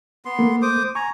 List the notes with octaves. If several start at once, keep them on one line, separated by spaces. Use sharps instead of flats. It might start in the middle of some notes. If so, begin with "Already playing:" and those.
B3 C6
A3 A#3
C5 D6 D#6
G#5 A#5 C#6